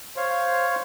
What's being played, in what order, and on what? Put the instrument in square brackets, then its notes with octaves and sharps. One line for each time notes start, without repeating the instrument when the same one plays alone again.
[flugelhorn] C5 [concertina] C#5 F5